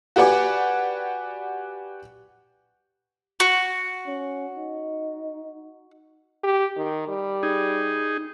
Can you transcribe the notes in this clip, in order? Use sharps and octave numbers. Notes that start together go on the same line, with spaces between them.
F#4 G4 B4 D5 F#5 G#5
F#4
C#4
D#4
G4
D#3
G3
D#4 G#4